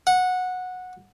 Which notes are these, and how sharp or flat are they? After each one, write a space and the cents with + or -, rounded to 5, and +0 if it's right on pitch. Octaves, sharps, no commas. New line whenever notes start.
F#5 -15